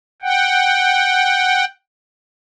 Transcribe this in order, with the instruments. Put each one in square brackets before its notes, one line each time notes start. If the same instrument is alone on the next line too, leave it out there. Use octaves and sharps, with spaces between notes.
[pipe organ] F#5 G5